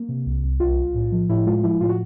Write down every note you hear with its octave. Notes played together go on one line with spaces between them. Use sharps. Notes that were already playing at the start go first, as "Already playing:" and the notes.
Already playing: A#3
C3
C2
C2
B1 F4
B1
A2
F3
A2 E4
G#3 F4
F3 E4
A2 F4
F#4